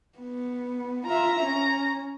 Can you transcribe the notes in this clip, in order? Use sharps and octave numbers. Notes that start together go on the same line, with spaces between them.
B3
F4 E5 A#5
C#4